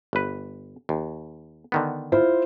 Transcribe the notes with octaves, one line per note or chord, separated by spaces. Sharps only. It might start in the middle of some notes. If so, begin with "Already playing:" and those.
G1 B4
D#2
D3 D#3 B3
E4 F4 C5